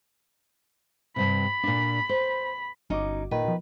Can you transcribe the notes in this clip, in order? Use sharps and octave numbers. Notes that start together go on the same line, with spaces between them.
G2 C3 B5
A#2 D4
C5
G1 C#4 D#4 F#4 D6
A#2 D#3 B4
B2 F3